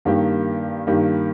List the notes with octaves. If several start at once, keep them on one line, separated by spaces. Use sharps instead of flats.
G2 D#3 A#3 G4
G2 D#3 A#3 G4